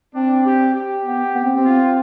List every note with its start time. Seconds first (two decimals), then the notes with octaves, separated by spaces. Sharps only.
0.15 C4 D4
0.45 G4
0.76 G4
1.05 B3
1.35 B3
1.45 C4
1.56 C4
1.65 F4